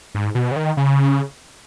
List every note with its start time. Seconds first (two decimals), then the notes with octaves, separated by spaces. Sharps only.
0.15 G#2
0.35 B2
0.52 C#3
0.56 D#3
0.77 C#3